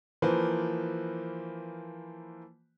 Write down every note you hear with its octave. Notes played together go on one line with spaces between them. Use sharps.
E3 F3 A#3 B4 C5